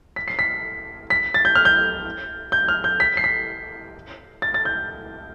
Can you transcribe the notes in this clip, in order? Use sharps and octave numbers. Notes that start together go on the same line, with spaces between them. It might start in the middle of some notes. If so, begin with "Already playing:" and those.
B6
C7
B6
B6
A6
G6
F6
G6
G6
F6
G6
B6
C7
B6
A6
A6
G6